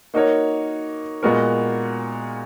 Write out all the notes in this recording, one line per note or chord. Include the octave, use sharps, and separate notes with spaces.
A#3 D#4 F#4 A#4 C#5
A#2 G#3 B3 F#4 A#4